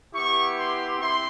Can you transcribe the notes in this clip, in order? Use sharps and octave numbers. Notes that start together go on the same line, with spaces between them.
B3 E4 G4 C#6
C6
C4 E4 C6